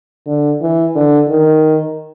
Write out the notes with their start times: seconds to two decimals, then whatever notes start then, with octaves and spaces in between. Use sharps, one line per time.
0.27 D3
0.61 E3
0.95 D3
1.29 D#3